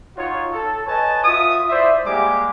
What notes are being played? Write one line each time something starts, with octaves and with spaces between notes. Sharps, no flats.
D#4 F4 F#4 C#5
A4
B4 C#5 D#5 G#5 A5
F4 F#4 E5 D#6
E4 C5 D5 E5
G3 G#3 A#3 G4 G#4 D6